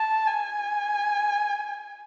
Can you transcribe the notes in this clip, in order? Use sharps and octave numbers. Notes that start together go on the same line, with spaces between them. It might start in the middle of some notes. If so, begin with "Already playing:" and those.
Already playing: A5
G#5